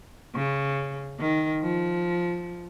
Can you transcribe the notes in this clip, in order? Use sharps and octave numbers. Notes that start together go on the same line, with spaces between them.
C#3
D#3
F3